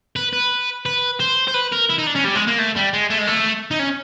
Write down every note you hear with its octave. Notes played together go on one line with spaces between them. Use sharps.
B4
B4
B4
C5
C5
B4
A#4
E4
D#4
D4
C#4
G3
G#3
A#3
A3
G3
G#3
A3
G#3
A3
D#4
C#4